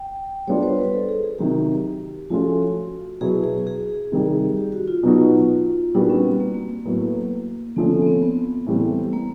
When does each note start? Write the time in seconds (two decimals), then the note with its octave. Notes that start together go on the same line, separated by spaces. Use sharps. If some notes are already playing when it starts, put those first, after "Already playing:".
Already playing: G5
0.47 G3 B3 D4 F4 C#5
0.63 C5
0.78 B4
0.93 A4
1.09 G#4
1.23 G#4
1.38 C3 D#3 F#3 G4
2.30 F3 A3 C#4 F4 F#4
3.21 B2 F#3 B3 E4 G#4
3.44 G#4
3.67 G#4
4.12 C3 D#3 G3
4.57 G4
4.72 F#4
4.88 F4
5.03 B2 F#3 B3 D#4 F#4
5.94 A#2 G3 B3 D4 D#4 F#4
6.10 C#4
6.24 C4
6.40 A#3
6.54 A#3
6.70 A#3
6.85 A2 F#3 B3
7.76 D3 F3 A3 B3 C#4
7.91 C4
8.02 B3
8.07 C4
8.22 B3
8.67 A2 E3 G3 C4
9.13 A#3